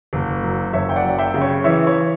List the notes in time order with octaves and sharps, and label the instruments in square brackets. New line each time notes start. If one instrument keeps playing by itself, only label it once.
[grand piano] F#1
F#2
F#1 C#5 E5
G5
D5 F#5
F#2
E5 G5
C#3
C#5
E3 C#5 E5
C#5